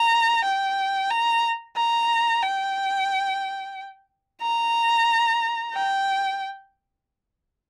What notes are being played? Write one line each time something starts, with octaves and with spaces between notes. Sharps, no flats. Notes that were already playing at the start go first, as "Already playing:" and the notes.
Already playing: A#5
G5
A#5
A#5
G5
A#5
G5